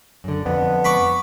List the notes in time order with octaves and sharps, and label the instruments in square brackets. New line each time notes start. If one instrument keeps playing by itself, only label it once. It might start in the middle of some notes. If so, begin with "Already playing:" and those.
[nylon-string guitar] F#2 D3
[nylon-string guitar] F2 D3 D4 [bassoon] B3
[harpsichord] B5 C#6 D6